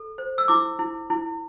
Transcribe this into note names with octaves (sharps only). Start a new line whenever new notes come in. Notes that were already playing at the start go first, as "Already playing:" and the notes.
Already playing: A4
C5
E6
E4 D6
E4
E4